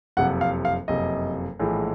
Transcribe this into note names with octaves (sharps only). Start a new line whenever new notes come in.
F#1 F2 C3 F#5
F5
F5
F#1 F2 C3 D#5
A#1 A2 E3 G#3